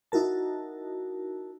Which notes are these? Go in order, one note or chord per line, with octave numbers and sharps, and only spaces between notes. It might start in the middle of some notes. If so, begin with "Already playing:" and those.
D#4 E4 F#4 A#4 A5